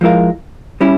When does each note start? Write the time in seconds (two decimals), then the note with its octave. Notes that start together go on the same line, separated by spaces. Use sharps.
0.01 F3 G#3 E4 A#4 F5
0.81 G3 C#4 E4